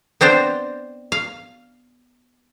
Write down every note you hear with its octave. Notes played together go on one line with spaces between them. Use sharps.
B3 C4 D4 C5
F5